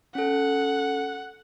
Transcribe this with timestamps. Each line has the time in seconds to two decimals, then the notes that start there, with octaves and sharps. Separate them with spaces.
0.15 C#4 A4 F#5